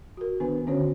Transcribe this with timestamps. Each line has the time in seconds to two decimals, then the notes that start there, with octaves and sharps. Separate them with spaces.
0.17 F#4 A#4
0.40 D#3 B3 D4 B4 G#5
0.67 D3 C#4 D4 F#4 C5 C#5